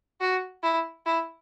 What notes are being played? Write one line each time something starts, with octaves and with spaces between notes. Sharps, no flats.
F#4
E4
E4